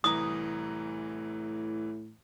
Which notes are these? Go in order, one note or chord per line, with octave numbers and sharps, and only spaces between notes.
C2 A2 E3 A#5 D#6